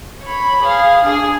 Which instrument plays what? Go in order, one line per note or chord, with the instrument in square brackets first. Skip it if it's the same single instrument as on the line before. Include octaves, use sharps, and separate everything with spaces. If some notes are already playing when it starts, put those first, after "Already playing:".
[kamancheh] C#5 B5
G#4 F5
D4 G#4